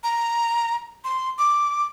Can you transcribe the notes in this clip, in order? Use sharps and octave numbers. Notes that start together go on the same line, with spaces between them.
A#5
C6
D6